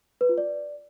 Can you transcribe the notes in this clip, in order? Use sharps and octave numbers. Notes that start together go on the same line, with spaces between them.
B4
F4
D5